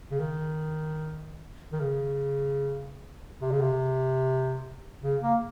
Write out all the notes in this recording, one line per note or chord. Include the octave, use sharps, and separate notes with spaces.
C#3
D#3
D#3
C#3
C3
C#3
C3
C#3
A#3